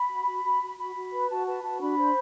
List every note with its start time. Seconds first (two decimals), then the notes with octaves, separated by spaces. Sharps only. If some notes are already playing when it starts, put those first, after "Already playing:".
Already playing: B5
0.10 F#4
0.26 F#4
0.44 F#4
0.61 F#4
0.78 F#4 B5
0.95 F#4
1.12 B4
1.29 F#4 A5
1.47 B4 A5
1.63 F#4 A5
1.81 D4 B5
1.98 C5